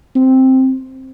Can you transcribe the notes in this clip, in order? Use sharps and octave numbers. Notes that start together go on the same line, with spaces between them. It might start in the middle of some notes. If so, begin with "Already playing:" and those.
C4